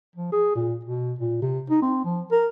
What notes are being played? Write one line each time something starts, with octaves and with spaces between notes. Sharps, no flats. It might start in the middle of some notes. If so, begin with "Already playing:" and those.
F3
G#4
A#2
B2
A#2
C3
D#4
C4
F3
A#4